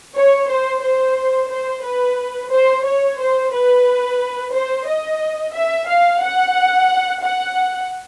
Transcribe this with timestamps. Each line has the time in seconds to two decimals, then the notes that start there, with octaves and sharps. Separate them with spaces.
0.16 C#5
0.49 C5
0.83 C5
1.51 C5
1.84 B4
2.52 C5
2.85 C#5
3.19 C5
3.53 B4
4.53 C5
4.87 D#5
5.55 E5
5.88 F5
6.22 F#5
7.23 F#5